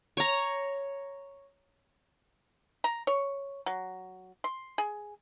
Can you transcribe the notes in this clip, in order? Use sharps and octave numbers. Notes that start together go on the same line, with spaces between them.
C#5 A#5
A#5
C#5
F#3
C6
G#4